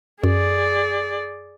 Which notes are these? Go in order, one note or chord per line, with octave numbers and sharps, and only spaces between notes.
F#2 G#4 D5